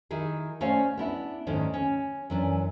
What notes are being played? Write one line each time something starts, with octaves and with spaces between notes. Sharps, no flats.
D#3 D#4 E4 G#4
A3 C#4 C5 D5 F5
B3 D4 E4
D2 G#2 D3 D#3 C#4
C#4
F#2 E3 D4